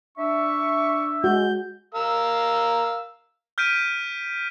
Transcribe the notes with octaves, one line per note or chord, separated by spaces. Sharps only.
D4 E5 C#6
G#3 F#4 G6
A#4 F5 E6
F6 G6 B6 D7 D#7